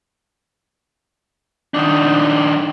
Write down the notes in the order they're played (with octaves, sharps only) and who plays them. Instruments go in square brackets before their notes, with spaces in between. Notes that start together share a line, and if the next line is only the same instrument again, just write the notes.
[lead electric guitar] D#3 D4